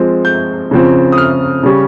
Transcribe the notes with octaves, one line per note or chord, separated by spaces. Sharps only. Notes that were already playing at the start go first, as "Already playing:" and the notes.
Already playing: F3 G#3 C4
G6
C#3 F3 C4
D#6
F6
C#3 G3 C#4